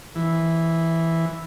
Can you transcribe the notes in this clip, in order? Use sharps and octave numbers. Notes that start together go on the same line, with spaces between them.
E3